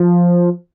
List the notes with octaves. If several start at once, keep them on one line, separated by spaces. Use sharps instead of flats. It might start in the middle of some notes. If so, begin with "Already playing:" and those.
Already playing: F3